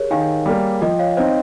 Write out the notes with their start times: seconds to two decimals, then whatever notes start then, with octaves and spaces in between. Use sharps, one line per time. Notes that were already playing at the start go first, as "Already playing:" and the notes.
Already playing: G4 G#4 A#4 C#5
0.11 D#3 F5 G#5
0.46 G3 A#3
0.81 F3 D#5 G5
0.99 C#5 F5
1.17 C4 D#4 C5 D#5